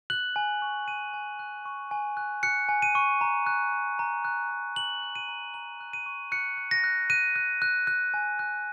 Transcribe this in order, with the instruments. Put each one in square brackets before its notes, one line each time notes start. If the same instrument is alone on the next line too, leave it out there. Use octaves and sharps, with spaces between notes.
[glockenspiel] F#6 F#7
G#5
C#6
G#5 D#7
G#5
F#6
C#6
G#5
F#6
F#6 C#7
G#5
D#7
C#6
A#5
F#6
A#5
A#5
F#6
A#5
A#5 F#7
F#6
D#7
A#5
A#5 F#7
F#6
D#7
C#6
F#6 C#7
F#6
A#6
F#6
F#6 D#7
F#6
F#6
F#6
G#5
F#6